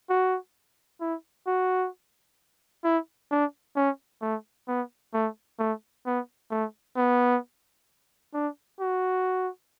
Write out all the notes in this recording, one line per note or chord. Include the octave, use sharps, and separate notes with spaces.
F#4
E4
F#4
E4
D4
C#4
A3
B3
A3
A3
B3
A3
B3
D4
F#4